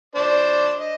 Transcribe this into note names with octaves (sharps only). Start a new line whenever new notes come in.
D4 C5 D5
D#5